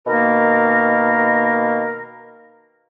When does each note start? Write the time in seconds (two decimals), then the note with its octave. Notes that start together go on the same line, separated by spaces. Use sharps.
0.07 B2 D#3 A#3 A#4